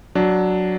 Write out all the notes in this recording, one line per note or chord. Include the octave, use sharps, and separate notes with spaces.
F#3 D4